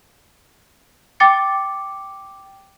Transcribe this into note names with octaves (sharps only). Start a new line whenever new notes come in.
G5 D6 A6 C#7